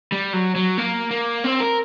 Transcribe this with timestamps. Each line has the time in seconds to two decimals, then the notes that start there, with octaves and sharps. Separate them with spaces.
0.12 G3
0.33 F#3
0.56 F#3
0.78 A#3
1.11 A#3
1.44 C4
1.60 A#4